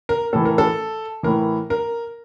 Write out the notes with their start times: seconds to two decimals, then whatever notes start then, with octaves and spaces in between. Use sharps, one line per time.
0.09 A#4
0.33 A2 E3 A4
0.45 A#4
0.58 A4
1.23 A2 E3 A#4
1.70 A#4